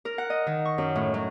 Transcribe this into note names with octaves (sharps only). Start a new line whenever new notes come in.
A#4
F#5
D#5
D#3
C#6
F#2
A2
F#3